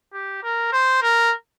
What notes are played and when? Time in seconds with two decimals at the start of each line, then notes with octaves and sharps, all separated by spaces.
0.13 G4
0.43 A#4
0.72 C5
1.02 A#4